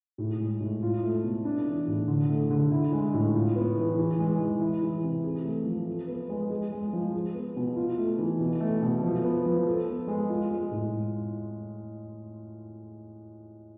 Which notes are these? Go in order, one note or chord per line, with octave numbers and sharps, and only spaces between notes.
A2
G#3
A2
F4
A3
B2
D4
E3
A2
D3
A3
D3
E4
G#3
A2
F4
B3
E3
E3
G#3
E3
E4
E3
C3
G#4
A3
F3
A4
B3
G#3
G#4
G#3
F3
G#4
B3
B2
F4
A3
E3
B2
A3
B2
F3
B3
F3
A4
B3
G#3
F4
G#3
A2